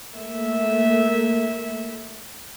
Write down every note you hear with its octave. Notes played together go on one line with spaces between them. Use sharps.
A3 A#3 E5